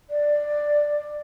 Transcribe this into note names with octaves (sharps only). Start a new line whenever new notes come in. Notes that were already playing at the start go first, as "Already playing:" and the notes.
D5